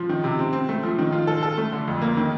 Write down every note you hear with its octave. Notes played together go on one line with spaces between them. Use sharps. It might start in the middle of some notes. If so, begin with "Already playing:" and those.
Already playing: F3
D#3
C3
C4
C4
A3
F3
D#3
F4
A4
A4
A3
D3
F2
A#3
D#3